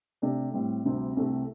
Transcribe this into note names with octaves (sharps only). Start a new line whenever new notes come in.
C3 A3 D4
A2 G3 C4
D2 C3 G3 C4
C2 C3 A3 C4